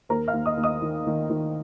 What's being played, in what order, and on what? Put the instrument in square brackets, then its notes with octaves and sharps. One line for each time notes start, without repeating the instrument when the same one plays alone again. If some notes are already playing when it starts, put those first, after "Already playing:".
[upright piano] D#2 A#4 A#5
F5 F6
D#2
D#5 D#6
D#2
D#5 D#6
D#3
D#3
D#3